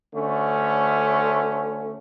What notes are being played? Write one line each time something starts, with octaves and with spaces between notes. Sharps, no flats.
D2 D3 A3 C#4